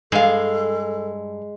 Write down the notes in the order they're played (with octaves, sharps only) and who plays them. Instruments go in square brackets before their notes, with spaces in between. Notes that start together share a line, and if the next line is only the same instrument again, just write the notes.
[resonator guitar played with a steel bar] G2 F5 [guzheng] G#3 [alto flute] A4